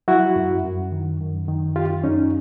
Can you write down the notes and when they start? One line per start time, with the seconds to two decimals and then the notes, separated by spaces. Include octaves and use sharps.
0.08 F#3 E4 F#4
0.36 F#2
0.64 F#2
0.92 D#3
1.20 F#2
1.48 D#3
1.76 F#2 F4 G4
2.04 F#2 C#4 D#4